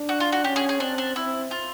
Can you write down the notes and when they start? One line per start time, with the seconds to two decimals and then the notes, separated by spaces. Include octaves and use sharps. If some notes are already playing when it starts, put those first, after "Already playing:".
Already playing: D4
0.09 F#4
0.20 F4
0.32 F#4
0.44 C#4 G4
0.56 G#4
0.69 G#4
0.80 C4 D4
0.98 D4
1.16 C4 E4
1.51 F4